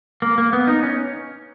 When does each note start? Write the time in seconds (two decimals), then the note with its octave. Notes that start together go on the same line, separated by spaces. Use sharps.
0.22 A#3
0.38 A#3
0.53 B3
0.67 D#4
0.83 C#4